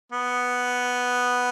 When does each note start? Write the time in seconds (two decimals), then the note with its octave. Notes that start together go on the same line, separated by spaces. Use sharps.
0.12 B3